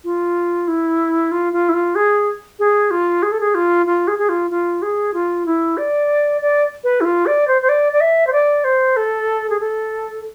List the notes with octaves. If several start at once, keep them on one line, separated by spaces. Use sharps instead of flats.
F4
E4
F4
F4
E4
F4
G#4
G#4
F4
G#4
A4
G#4
F4
F4
G#4
G#4
F4
F4
G#4
F4
E4
D5
D5
B4
E4
F4
D5
C5
C5
D5
D5
E5
C5
D5
C5
A4
G#4
A4